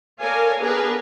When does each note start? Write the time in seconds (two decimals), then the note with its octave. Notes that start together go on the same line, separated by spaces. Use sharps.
0.21 A4 A#4 C#5 D5 F5 G#5
0.62 B3 D4 G#4 A#4 B4